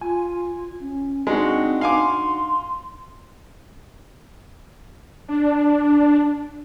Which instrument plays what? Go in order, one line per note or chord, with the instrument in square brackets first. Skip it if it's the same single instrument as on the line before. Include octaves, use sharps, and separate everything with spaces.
[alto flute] F4 [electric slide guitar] G#5
[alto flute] C#4
[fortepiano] G#3 [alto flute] C4 [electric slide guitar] D4 D#4 F#4
[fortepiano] F5 G#5 D6 [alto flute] C6
[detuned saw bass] D4